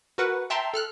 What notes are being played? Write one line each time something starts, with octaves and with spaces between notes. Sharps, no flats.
F#4 A#4 B4 F#5
E5 G5 A5 A#5 C6
A4 F6 F#6